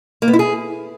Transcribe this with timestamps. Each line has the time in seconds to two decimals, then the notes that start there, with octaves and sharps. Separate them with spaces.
0.22 A#3
0.28 B3
0.33 E4
0.39 G#4